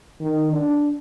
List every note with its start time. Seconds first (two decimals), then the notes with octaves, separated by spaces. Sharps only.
0.21 D#3
0.52 D4